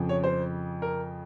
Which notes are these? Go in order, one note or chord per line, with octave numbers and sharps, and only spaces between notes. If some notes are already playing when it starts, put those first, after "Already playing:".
Already playing: F2 C#3 F3
C#5
C5
A#4